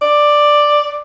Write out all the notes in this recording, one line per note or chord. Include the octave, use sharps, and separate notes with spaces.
D5